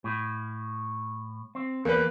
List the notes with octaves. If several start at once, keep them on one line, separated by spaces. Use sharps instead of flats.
A2
C4
E2 A#3 B4